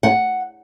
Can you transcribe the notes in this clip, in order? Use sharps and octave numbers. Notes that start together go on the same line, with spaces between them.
F#5